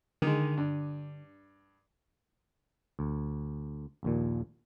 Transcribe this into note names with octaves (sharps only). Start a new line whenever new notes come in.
D3 D#3 G#3
G2
D2
A#1 D#2 A#2